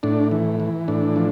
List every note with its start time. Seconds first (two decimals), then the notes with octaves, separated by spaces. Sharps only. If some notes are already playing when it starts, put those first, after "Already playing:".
0.03 A2 D4
0.31 E3
0.60 E3
0.88 A2 D4
1.16 F3